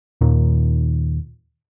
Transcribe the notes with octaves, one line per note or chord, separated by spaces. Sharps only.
D#2 A#2 D#3